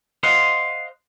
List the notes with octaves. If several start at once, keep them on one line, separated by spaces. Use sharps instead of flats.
C5 D#5 F5 F#5 C6